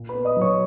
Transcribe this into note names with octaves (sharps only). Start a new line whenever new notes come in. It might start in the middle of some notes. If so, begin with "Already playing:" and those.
Already playing: A#2
B4 B5
B3
D#5 D#6
F#3 C#5 C#6